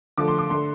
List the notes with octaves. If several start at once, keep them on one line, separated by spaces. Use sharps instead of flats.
D3 F3 A3 D6
C6
D6
D3 A3 C6